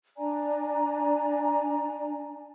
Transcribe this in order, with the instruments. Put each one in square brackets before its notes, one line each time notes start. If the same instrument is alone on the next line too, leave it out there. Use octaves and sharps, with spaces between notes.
[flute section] D4 D5 G#5 A#5